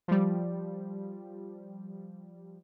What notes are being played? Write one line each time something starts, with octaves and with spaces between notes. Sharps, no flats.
F3 G3